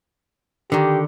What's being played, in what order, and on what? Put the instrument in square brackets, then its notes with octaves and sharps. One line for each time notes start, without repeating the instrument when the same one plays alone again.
[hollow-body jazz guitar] D3 D#3 [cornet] G4